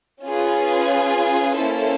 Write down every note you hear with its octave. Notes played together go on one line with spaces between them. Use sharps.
C#4 F4 G#4 B4
A#3 C#4 E4 A4 C5